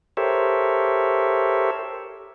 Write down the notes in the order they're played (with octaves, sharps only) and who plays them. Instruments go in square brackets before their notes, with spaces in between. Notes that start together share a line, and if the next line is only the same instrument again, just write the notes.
[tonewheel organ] G4 A4 A#4 C5 C#5 E5